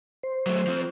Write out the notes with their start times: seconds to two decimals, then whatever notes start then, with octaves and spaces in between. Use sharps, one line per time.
0.23 C5
0.47 F#3 A3
0.67 F3 C4